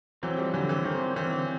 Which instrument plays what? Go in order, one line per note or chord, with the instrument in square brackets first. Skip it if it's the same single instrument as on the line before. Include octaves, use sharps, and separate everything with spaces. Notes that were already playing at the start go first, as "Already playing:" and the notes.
[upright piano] E3 F#3 [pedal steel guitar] C4
[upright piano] F3 G3
[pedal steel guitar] D3 [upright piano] E3 F#3
[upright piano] E3
[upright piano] D#3 [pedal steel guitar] C4
[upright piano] E3 [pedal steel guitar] C4